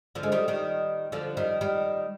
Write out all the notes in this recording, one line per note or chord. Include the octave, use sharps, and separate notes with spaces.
D3 F3
G#3
D#3 G3
D#3 G3
D3 F3
D#3 G3
D#3 G3